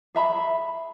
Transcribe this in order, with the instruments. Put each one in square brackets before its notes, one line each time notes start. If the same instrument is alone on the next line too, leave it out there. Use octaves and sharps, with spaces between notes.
[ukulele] G#4 E5 A#5 B5